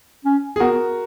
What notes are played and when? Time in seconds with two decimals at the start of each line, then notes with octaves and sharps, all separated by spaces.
0.25 C#4
0.56 G#4
0.60 B3 F#4 A#4